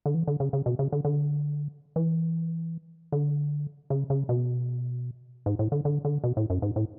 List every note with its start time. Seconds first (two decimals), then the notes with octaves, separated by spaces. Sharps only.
0.06 D3
0.14 E3
0.27 D3
0.40 C#3
0.53 C#3
0.66 B2
0.79 C#3
0.92 D3
1.05 D3
1.96 E3
3.12 D3
3.90 C#3
4.10 C#3
4.29 B2
5.46 G#2
5.59 A2
5.72 D3
5.85 D3
6.05 D3
6.24 B2
6.37 A2
6.50 F#2
6.62 G#2
6.76 A2